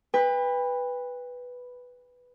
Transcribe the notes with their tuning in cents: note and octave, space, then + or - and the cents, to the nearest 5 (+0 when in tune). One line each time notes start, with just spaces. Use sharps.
B4 +0 G5 +40